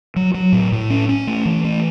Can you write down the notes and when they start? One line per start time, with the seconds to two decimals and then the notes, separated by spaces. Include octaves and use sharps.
0.16 F#3
0.34 F#3
0.52 A2
0.72 A2
0.90 C#4
1.09 C#4
1.27 A3
1.46 E3
1.64 A3